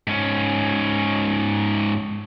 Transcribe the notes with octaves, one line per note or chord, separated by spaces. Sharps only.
G#2 C#4